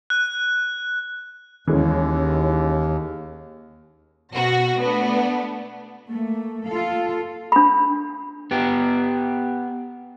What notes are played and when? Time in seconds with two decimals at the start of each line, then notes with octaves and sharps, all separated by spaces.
0.10 F#6
1.68 D#2 E3 G#3 C#4
4.33 B2 F#4 A#6
4.78 A3 B3 D4
6.08 A3 A#3
6.67 F4 A4 F5
7.52 D4 B5
8.51 B3 G4